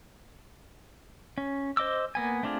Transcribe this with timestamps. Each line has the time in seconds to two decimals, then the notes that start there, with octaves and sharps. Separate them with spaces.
1.38 C#4
1.77 C5 D#5 D6 E6
2.15 A#3 B3 G#5
2.43 A3 C4 D4 F4 G#4